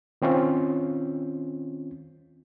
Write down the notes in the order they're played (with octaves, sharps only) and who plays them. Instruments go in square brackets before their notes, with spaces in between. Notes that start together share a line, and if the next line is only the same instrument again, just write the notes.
[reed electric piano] D#3 C4 C#4 F4